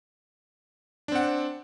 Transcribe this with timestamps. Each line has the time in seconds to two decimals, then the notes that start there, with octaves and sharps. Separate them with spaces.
1.08 D4
1.12 C4
1.15 F#5